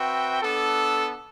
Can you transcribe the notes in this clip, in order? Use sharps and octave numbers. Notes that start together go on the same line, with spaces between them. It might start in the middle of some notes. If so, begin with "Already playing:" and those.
Already playing: C4 F#4 B4 E5 G5
B3 D4 A4